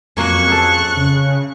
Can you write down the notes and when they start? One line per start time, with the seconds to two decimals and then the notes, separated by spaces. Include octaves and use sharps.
0.17 F2 F#3 A#3 C#4 C#6 F#6
0.48 G#4 A4
0.97 C#3